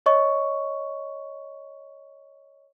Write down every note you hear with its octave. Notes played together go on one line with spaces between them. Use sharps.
C#5 D#5 C#6